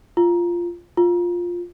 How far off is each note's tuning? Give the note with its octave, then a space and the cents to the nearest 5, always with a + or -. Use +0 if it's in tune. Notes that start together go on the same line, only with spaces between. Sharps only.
F4 -10
F4 +5